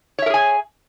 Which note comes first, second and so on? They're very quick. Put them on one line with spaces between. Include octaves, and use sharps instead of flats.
C#5 E5 A#4 G#4 G#5